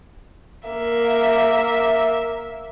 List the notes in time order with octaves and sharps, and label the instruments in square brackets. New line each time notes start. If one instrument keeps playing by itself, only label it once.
[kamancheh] A#3 E5